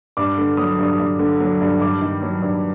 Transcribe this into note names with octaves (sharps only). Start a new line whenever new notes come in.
G2 D6
D3
F#3 D#6
G2 D#6
G2
D3
F#3
G2
G2 D6
D#3
F#3
G2